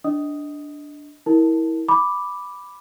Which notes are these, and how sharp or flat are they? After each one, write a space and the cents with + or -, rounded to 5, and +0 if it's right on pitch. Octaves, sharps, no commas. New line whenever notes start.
D4 +0 D#5 +20 D#6 +0
E4 -20 A#4 +0 A5 +0
B5 +0 D6 +0